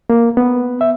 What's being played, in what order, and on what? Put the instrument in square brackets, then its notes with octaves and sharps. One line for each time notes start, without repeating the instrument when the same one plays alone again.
[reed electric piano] A#3
B3
E5